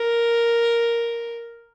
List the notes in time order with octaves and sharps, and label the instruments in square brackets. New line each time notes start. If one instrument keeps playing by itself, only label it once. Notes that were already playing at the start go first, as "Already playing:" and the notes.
Already playing: [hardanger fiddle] A#4